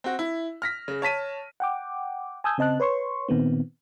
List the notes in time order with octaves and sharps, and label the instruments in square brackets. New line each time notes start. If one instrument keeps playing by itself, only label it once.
[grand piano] C4 F#4
E4
F6 A#6 B6
C#3
C#5 A5 B6 D#7
[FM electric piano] F#5 G5 D6
G#5 A5 D#6 E6 G6 G#6
C#3 C4 D#5 A5 F#6
B4 C#5 C6 C#6
A#2 D#3 B3 C4